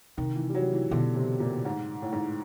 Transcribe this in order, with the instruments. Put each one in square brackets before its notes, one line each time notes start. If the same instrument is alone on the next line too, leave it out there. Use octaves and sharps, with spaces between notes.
[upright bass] C3 [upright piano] D#3
[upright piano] E3
G3
F#3
E3
[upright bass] B2 [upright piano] D3
[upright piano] C3
A#2
G#2
A2
G#2